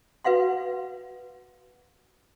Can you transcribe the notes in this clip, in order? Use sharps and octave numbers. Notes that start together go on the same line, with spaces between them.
F#4 B4 F5 F#5 C6